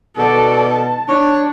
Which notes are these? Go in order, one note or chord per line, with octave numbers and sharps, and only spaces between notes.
B2 A4 D5
A5
D4 C#5